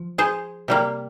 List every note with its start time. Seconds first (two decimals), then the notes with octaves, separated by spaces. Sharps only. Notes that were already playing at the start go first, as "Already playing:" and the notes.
Already playing: F3
0.18 G#4 C5
0.68 C3 G3 A#3